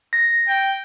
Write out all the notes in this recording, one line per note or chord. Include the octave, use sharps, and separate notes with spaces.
A#6
G5